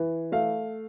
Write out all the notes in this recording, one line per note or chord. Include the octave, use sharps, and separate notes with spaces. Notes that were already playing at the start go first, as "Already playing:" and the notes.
Already playing: E3
A3 F5